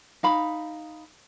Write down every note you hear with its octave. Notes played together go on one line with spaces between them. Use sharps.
D#4 F5 B5